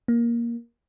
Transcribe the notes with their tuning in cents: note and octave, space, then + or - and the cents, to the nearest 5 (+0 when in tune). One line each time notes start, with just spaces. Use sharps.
A#3 +10